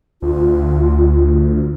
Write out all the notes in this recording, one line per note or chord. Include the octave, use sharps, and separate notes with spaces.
D2 F4